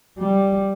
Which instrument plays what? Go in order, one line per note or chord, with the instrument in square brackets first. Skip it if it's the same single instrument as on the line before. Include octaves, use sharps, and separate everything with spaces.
[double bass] G3